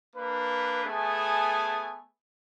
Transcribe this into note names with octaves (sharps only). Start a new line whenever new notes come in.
A#3 D4 B4
A3 B3 G#4 G#5 A5